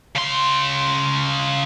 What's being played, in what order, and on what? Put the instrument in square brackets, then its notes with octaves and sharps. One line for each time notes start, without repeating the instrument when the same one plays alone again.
[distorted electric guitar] C#3 C6